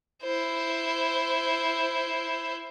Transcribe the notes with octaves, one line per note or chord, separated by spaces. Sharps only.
E4 C5